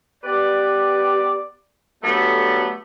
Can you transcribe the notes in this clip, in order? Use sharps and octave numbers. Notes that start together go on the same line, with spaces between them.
B3 G4 B4 D5
F#3 G3 A3 B3 D4 A4